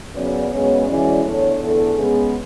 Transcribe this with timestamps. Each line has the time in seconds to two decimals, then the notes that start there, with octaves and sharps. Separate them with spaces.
0.14 F#2 C#3 F#3 B3 D5
0.50 F#2 C#3 G#3 B3 C#5
0.86 F#2 E3 G#3 C#4 D5
1.23 E2 D3 A3 C#5
1.59 E2 D3 A3 A4
1.95 C#3 G#3 B3 G#4